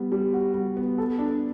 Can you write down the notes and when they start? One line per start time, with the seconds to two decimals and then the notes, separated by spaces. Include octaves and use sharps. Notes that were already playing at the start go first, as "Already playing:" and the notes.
Already playing: G3 B3
0.12 G3
0.34 F#4
0.54 G3
0.77 B3
0.98 A4
1.19 D4